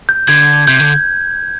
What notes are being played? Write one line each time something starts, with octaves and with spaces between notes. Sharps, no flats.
G6
D3 G#6
C3 G6
D3